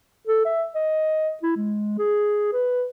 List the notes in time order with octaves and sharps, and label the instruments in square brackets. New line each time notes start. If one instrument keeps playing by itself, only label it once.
[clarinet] A4
E5
D#5
E4
G#3
G#4
B4